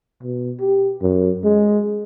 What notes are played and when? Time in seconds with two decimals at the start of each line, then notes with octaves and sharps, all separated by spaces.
0.23 B2
0.60 G4
1.02 F#2
1.44 G#3